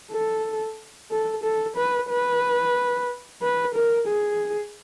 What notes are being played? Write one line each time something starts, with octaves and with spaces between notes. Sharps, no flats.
A4
A4
A4
B4
B4
B4
A#4
G#4